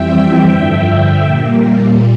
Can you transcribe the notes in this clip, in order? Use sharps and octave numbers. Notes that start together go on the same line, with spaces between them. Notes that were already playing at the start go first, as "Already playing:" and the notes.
Already playing: F2 E3 G3 C4 E5 G5
G2 D3 F3
A#2 G3 A#3